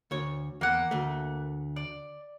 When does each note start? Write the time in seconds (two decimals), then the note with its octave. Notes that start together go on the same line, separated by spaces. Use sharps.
0.11 D2 C#5
0.61 E2 A#3 F#5
0.91 D2 A3
1.76 D5